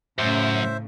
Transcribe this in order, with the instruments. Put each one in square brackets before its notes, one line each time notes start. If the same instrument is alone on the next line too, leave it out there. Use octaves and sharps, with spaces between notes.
[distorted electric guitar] F#2 [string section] A2 C#3 [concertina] C5 E5